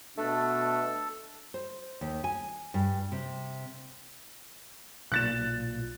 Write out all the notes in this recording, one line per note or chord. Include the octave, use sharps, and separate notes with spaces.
B2 A3 D4 A4
C5
D#2
G#5
G2
C3
B1 A#2 F#6 A6 E7